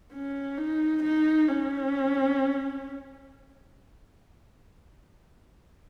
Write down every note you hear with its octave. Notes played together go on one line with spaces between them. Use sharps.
C#4
D#4
D#4
C#4